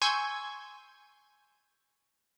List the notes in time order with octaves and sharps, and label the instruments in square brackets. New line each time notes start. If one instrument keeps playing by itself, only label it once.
[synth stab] G#5 C6 C#6 E6 G6 G#6